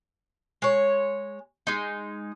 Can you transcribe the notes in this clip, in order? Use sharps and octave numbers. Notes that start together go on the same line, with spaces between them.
G#3 C#5
G#3 D#4